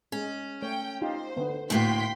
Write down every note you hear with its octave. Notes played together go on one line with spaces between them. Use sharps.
G#3 C#4
A3 C#5 G5
D#4 F4 G4 C5
D3 B3
D2 A2 C#3 A#3 F#4 G5 C6 B6